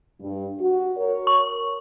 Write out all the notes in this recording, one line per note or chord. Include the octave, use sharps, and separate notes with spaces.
G2
F#4
A#4 C#5
C#6